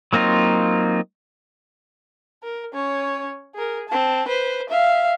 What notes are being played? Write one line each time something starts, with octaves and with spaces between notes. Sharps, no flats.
F#3 A#3 C4 D#4 F4
A#4
C#4 C#5
G#4 A#4
C4 A5
B4 C5
E5 F5